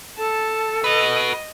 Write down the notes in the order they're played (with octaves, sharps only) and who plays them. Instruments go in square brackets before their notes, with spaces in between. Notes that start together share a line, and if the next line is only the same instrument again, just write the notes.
[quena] A4 [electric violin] A5
[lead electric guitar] F#4 B4 [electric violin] D#5